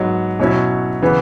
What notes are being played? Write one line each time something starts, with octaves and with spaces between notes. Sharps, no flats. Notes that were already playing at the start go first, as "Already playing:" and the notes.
Already playing: G#2 F#3 B3
B2 F#3 C#4 E4
C#3 E3 B3